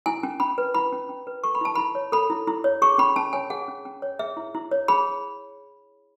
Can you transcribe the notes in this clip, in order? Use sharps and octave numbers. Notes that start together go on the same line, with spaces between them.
E4 G#5
C#4
C#4 B5
B4
E4 B5
C#4
C#4
B4
A4 C#6
B5
E4 A5
E4 B5
C#5
A4 B5
E4
E4
C#5
G#4 C#6
C#4 B5
C#4 A5
C#5 G#5
G#4 F#5
C#4
C#4
C#5
G#4 E5
E4
E4
C#5
G#4 B5